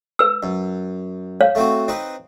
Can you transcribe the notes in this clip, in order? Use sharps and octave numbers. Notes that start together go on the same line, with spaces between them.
B4 E6
F#2
C#5 F5
A3 C4 F#4
C4 D#4 B4